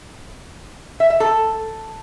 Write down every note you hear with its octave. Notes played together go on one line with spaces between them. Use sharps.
E5
E5
A4